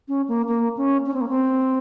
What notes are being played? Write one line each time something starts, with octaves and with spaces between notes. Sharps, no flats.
C#4
A#3
A#3
C#4
C#4
C4
A#3
C4